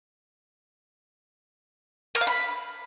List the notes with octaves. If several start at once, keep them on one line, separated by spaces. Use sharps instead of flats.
A#4
F5
B5